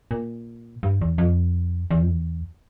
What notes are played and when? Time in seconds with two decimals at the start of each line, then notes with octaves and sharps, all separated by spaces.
0.11 A#2
0.83 G2
1.01 E2
1.18 F2
1.90 E2
2.01 F2
2.10 E2